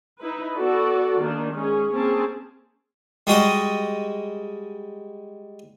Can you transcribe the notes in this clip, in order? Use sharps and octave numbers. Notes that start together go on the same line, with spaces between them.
D#4 E4 B4
B3 F#4 A4 D5
D#3 A#3 D4
G#3 C#4 G#4
A#3 C4 C#4 G#4 A5
G3 G#3 F#4 D#5